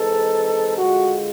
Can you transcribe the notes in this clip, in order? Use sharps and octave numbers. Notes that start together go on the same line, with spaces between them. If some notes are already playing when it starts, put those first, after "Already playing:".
Already playing: E3 G#3 C4 D#4 A4
D3 F3 G#3 F#4